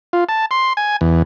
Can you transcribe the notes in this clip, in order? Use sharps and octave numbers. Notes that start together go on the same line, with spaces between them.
F4
A5
C6
G#5
E2